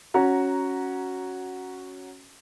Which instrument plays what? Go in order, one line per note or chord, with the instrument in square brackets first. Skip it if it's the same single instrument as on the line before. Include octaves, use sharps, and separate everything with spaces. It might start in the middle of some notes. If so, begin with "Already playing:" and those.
[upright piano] C#4 F#4 A#5